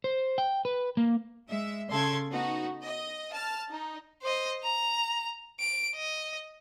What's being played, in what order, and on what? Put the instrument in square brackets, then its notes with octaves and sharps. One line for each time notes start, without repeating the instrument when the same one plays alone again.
[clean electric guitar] C5
G5
B4
A#3
[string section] G#3 E5
C#3 A4 C6 G#6
B3 D#4 F#4
D#5
A5 F6
D#4
[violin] C5 D#5
A#5
D7
D#5